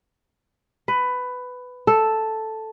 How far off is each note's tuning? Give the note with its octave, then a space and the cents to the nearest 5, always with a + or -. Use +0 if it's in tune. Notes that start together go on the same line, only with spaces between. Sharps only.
B4 +15
A4 +0